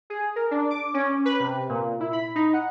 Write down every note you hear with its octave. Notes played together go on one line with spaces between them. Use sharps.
G#4
A#4
D4
D6
C#4
B4
C3
A#2
E4
B5
D#4
F#5